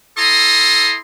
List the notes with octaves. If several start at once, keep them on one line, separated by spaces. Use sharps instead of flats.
E4 A4 A#5 C6 D#6